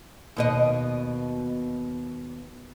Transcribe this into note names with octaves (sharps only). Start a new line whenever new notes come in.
D#2 B2 D#5